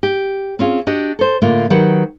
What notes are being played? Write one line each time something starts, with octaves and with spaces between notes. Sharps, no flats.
G4
C4 C#4 F4 G#4
D4 F#4 G4 D#5
A4 C5
A2 D3 A3 A#3 F4
D#3 F#3 G4 B4 F#5